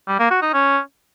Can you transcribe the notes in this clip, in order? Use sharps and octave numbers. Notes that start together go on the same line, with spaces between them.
G3
A#3
F#4
D#4
C#4